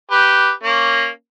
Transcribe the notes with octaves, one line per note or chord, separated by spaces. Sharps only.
G4 B4
A#3 C#4